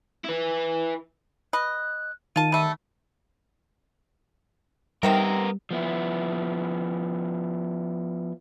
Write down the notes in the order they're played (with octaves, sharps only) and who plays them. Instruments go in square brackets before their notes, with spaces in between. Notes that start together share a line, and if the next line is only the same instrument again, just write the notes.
[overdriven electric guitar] E4 B4
[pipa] B4 D#5 [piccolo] F#6
[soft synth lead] D#3 [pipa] F4 A5 [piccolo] D#7
[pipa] G3 A3
[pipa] C3 D#3 C4 [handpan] G3 [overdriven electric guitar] B3 A#4
[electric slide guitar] F3 B3 E4